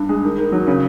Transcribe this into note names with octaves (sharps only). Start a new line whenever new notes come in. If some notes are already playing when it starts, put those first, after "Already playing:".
Already playing: G2
G#3
D#3
D#3
F#3
C#3